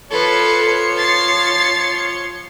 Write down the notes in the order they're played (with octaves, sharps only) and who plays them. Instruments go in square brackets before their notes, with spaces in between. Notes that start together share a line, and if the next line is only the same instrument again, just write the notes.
[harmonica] F3 C#5 C6 [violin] A4 B4
[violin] A6 C7